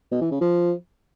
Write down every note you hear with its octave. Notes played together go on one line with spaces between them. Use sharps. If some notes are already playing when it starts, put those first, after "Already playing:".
B2
E3
C#3
F3